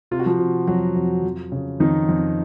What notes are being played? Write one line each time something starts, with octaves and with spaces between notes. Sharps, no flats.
C3 F4
F#4
F3 F4
C3
F2 F#3 F#4
F2
F2
C#3
F2 D#3 D#4
F2